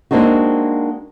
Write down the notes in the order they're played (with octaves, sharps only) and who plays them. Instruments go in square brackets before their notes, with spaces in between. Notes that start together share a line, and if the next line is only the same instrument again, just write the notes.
[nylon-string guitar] G#3 A#3 C4 D4 D#4 F#4